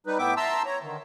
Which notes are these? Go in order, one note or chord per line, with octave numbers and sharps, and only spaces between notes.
G3 D#4 B4
A2 B3 E5 G5 D6
E5 A5 A#5 C6 E6
C#5 A#5
D3 D#3